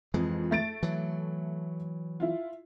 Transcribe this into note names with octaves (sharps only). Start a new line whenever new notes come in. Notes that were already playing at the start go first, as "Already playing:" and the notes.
F2 E3 G#3
A3 A6 D7
E3 F#3
E4 F4